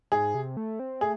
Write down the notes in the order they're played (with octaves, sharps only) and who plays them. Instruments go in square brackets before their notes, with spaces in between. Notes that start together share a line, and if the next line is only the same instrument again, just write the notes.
[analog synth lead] G#2 [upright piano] G#4
[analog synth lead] C3
A3
C4
[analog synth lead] A3 [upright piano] G#4